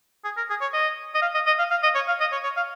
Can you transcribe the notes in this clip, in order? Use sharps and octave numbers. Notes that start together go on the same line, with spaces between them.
G#4
A#4
G#4
C#5
D#5
D#5
F5
D#5
D#5
F5
F5
D#5
C#5
F5
D#5
C#5
C#5
F5